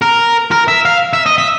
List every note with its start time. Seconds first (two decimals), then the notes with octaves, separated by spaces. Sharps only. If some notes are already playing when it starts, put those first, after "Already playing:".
0.02 A#4
0.51 A#4
0.68 E5
0.85 F5
1.13 E5
1.26 D#5
1.38 E5